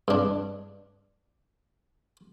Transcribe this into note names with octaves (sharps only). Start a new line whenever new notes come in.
G2 D4